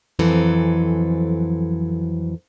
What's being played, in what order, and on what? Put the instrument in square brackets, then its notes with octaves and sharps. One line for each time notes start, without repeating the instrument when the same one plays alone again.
[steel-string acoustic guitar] F2 E3 F#3 C4 A4 G#5